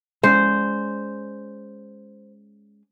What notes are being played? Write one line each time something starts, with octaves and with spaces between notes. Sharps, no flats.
G#3 C#4 C5 D5